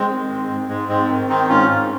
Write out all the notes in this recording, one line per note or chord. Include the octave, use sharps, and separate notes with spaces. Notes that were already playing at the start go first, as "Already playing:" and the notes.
Already playing: G#3 C4
D#3
G#2
G#2
G#2 G#3
G#2 G#3 C4
D#3
D#3 C4 D#4
G#2 C#4 F4
G#2